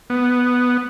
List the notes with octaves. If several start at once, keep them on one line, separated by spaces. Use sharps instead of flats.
B3